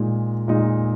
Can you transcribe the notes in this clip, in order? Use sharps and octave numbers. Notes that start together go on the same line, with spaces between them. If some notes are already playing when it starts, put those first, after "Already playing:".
Already playing: A#2 G#3 D#4
A#2 G#3 D#4